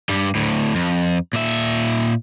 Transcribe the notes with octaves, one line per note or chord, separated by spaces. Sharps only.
G2 G3
D2 A2
F2
A#2 E5